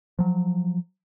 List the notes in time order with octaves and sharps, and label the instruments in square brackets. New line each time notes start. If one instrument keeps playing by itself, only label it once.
[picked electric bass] F3 F#3